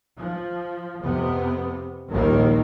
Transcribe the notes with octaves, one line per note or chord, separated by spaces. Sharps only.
F3
F2 C3 B3
A#1 D#2 D#3 G3 A#3